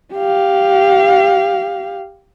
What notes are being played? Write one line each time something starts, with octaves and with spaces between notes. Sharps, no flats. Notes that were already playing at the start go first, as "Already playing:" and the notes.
G4 F5